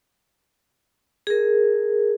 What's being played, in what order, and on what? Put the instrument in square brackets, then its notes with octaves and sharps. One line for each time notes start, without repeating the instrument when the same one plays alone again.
[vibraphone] G#4 A#4